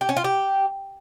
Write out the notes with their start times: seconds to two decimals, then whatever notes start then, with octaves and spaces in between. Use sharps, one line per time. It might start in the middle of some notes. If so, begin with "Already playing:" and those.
0.01 G4
0.09 C#4
0.17 F4
0.24 G4